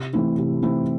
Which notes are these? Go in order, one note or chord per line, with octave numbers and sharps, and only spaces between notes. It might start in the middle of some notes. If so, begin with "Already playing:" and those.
Already playing: C3
E3 A3 C4 E4
C3
E3 A3 C4 E4